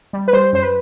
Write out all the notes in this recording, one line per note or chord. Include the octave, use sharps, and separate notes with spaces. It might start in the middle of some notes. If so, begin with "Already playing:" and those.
G3
B4
G3 C5
F#2 C5
B4